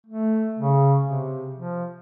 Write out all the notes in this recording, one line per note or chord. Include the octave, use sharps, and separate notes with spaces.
A3
C#3
C3
F3